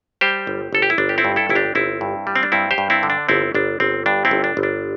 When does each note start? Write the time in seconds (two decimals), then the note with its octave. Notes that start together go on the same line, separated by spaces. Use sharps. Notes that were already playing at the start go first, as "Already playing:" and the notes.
0.21 G3 G4 C5
0.47 G1
0.73 G1 A4
0.82 G4
0.90 E4
0.98 G1 D4
1.09 G4
1.18 C4 E4
1.25 G2
1.36 E4 A4
1.49 G1 E4
1.55 D4 G4
1.75 G1 C4 E4
2.01 G2
2.27 G3
2.36 C4
2.43 D4
2.52 G2 C4 E4
2.71 G4 C5
2.78 G2
2.90 C4 E4
3.03 D3
3.10 D4
3.29 G1 C4 E4
3.55 G1 D4
3.80 G1 C4
4.06 G2 D4
4.25 C4 E4
4.31 G1
4.44 D4
4.57 G1
4.63 D4